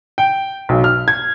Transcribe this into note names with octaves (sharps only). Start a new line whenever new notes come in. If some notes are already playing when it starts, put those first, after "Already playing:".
G5
B1
F6
G#6